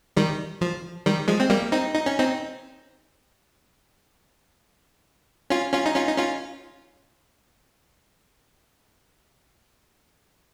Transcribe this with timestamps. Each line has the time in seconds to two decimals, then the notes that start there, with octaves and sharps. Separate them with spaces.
0.17 D#3 G3
0.61 F3
1.06 D#3 G3
1.28 F3 G#3
1.40 C4
1.50 G3 A#3
1.72 C4 D#4
1.95 D#4
2.06 C#4
2.18 C4 D#4
5.50 C#4 F4
5.73 C#4 F4
5.86 D#4
5.95 C#4 F4
6.08 D#4
6.17 C#4 F4